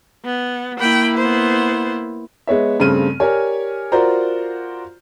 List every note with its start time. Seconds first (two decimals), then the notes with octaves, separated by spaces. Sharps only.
0.25 B3
0.80 A#3 E4 G5 B5
1.17 B3 C5
2.47 G#3 B3 C#5 E5
2.80 G2 C#3 A3 C4 F6 D#7
3.20 G4 A#4 C#5 D5 G#5
3.92 F4 F#4 A#4 C5 D5 A#5